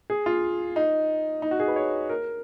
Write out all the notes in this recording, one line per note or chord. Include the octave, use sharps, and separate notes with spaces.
G#4
F4
D#4
D#4
F#4
G#4
B4
C#5
A#4